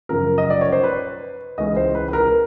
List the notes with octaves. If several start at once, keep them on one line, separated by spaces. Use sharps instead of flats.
F#2 C#3 F3 A#4
D#5
D5
C#5
C5
B4
C#2 C#3 E3 G#3 C#4 D#5
C5
B4
B4
A#4